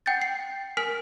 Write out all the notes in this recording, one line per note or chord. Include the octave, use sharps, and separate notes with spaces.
F#5 G5 G6 A6
C7
A#4 G#5 F6 B6